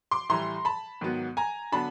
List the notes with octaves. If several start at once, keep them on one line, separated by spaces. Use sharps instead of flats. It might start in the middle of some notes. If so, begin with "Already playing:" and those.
C6 D6
A2 E3 G3 A#5 C6
A5 B5
G#2 D#3 F#3 B3
G#5 A#5
D3 F#3 B3 D4 A5 B5